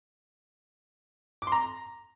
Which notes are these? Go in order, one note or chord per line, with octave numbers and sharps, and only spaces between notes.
D6
C6
A#5